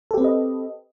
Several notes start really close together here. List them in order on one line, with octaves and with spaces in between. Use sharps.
A4 G4 C4 B4 D#5